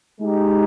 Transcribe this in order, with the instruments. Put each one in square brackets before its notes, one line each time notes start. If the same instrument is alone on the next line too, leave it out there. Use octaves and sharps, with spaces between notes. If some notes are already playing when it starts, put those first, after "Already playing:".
[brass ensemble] G#3 D#4 G4